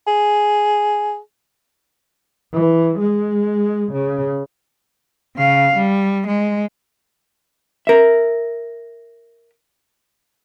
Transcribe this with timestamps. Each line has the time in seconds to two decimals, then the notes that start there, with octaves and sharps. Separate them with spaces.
0.07 G#4
2.53 E3
2.99 G#3
3.93 C#3
5.36 C#3 F5
5.76 G3
6.28 G#3
7.87 A#4 E5